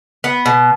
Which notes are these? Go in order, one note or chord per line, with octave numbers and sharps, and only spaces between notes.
B3
B2